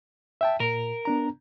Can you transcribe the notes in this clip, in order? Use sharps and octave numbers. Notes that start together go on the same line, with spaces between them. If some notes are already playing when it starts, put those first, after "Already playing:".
E5 G5 A5
A#2 A#4
B3 D4 A#5